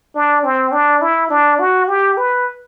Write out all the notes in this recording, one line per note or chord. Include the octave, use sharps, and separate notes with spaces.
D4
C4
D4
E4
D4
F#4
G4
B4